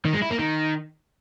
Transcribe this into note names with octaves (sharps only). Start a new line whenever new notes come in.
D#3
G#3
E4
A#3
D#3